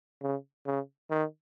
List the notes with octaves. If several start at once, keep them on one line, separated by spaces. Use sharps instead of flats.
C#3
C#3
D#3